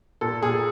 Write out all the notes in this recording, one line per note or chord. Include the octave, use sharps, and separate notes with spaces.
A#2 A4
A#2 G#4